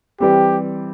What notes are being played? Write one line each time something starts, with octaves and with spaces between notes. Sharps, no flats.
E3 G3 C4 G4